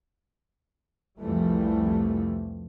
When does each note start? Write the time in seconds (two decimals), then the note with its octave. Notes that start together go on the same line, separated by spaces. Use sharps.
1.20 C2 F2 E3 F3 G3 A3